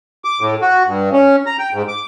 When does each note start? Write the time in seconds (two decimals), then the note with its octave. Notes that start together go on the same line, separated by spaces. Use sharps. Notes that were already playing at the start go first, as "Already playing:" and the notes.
0.25 D6
0.41 A2
0.61 F#4
0.87 G2
1.12 C#4
1.46 A#5
1.59 G5
1.73 G#2
1.88 D6